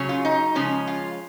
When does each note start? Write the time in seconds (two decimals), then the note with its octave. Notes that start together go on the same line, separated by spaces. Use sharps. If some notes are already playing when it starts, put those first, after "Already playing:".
Already playing: C#3 F#3 C#4
0.09 F4
0.25 D#4
0.55 C#3 F3 G#3 C#4
0.87 F4